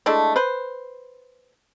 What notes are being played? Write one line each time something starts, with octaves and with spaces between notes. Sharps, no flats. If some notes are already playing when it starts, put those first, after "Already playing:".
G#3 A3 D4 E4
B4 C5